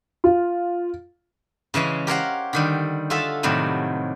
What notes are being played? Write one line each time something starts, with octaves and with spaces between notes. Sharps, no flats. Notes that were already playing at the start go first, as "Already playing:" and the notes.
F4
C#3 E3 G#3 C#4
G4 A#4 C5 C#5 F5 F#5
D3 D#3 G3
F4 F#4 G#4 A4 E5 A5
A2 C3 D#3 F#3 G3